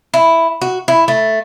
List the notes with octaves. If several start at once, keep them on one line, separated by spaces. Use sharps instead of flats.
E4
F#4
E4
A3